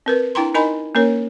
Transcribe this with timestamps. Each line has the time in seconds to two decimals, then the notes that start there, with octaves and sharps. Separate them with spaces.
0.06 C4 A#4 B4
0.35 D4 E4 G5 A#5 C6
0.54 D#4 A#4 D#5 G#5 A#5 B5
0.95 A#3 C#4 A#4 C#5